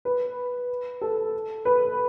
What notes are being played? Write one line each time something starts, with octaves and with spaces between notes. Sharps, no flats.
B4
A4
B4